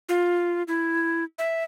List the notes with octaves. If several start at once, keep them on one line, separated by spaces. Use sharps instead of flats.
F4
E4
E5